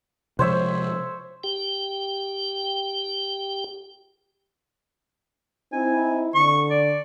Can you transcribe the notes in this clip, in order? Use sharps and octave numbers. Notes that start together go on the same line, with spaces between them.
C3 F3 G#3 C5 C#5 E5
G4 G5
C4 D#4 E4 G#5
D3 C#6
D5